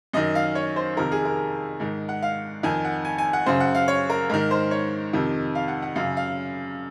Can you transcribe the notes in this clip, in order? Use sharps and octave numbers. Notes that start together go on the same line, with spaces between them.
F#2 D#3 D#5
F5
C#5
C5
F2 C3 D#3 A#4
G#4
A#4
G#2 D#3
F#5
F5
F2 D#3 G#5
F#5
G#5
G#5
F#5
F#2 C#3 C5
F#5
F5
C#5
A#4
G#2 D#3 A#4
C5
C#5
F2 C3 D#3
F5
F#5
F#5
F#2 C#3 F5
F5